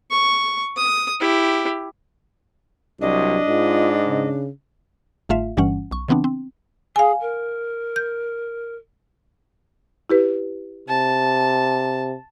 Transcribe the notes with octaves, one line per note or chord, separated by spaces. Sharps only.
C#6
D#6
E4 G4
C2 F#3 D4 D#5
G#2 F4
C#3
G1 G#2 A3 F4 E5 F5
G1 G2 E3 G3 C#4 F#5
B1 C#6
C#3 E3 B3 C4 D4
C4
G#4 F5 G#5
A#4
G6
E4 G4 B4
C3 A5